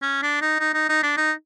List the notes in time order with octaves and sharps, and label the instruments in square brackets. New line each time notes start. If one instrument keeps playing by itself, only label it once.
[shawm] C#4
D4
D#4
D#4
D#4
D#4
D4
D#4